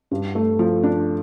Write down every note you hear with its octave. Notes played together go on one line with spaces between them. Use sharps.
G2
A3
F3
D4